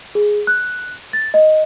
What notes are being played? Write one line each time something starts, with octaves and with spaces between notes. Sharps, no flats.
G#4
F#6
A6
D#5